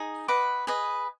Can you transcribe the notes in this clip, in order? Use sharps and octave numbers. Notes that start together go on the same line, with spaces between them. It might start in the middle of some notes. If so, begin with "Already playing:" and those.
Already playing: D#4 G#4
B4 D#5 F#5 D6
G#4 B4 D#5